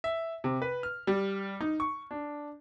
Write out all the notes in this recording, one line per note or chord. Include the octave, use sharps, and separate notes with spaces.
E5
C3
B4
F6
G3
D#4
C#6
D4